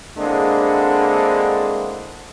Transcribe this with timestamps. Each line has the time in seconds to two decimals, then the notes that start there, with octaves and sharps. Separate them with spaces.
0.18 D3 G#3 A#3 C4 D4 E4